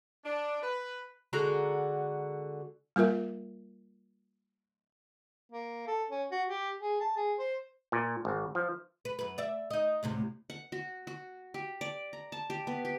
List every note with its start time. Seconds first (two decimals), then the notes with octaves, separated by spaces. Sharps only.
0.24 D4
0.63 B4
1.33 D3 G#3 F#4 A#5
2.96 G3 A#3 F4 A#4 E5
5.52 A#3
5.87 A4
6.10 C#4
6.31 F#4
6.48 G4
6.82 G#4
7.00 A5
7.16 G#4
7.39 C5
7.92 A#2
8.25 G#1
8.55 F3
9.05 B4
9.19 F#2 B4
9.38 D5 E5
9.71 D#4 D#5
10.03 D2 A2 C3
10.50 F#5
10.72 F#4
11.07 F#4
11.54 G4
11.81 D5
12.13 A#5
12.32 A5
12.50 G4
12.67 B3
12.85 G4